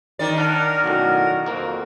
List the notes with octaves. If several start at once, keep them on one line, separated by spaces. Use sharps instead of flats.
D#3 D5
D4 A#4 F#5 F6
B1 F#2 A2 F#4
F2 A#3 F#4